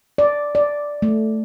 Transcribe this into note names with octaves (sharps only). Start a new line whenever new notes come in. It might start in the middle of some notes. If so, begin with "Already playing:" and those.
D5
D5
A3